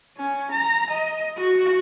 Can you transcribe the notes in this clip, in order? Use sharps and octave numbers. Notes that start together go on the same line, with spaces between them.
C#4
A#5
D#5
F#4